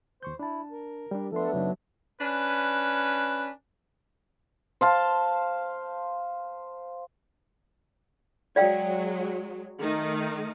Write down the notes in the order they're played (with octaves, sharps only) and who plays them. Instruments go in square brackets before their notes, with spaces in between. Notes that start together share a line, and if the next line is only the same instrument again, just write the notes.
[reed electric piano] D#2 C#6 G6 [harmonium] C5
[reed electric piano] D4 A5 [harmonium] E4
[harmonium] A#4
[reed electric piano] G3 D4 [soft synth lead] G4
[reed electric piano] F3 C6 [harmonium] A3 B3 D4 [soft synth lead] A4
[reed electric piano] F#2 C#3 D#4 [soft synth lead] F#3
[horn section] C#4 D4 B4
[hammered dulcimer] C5 F5 A5
[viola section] F#3 G#3 [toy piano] D5 F5 G5
[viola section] D#3 A3 D#4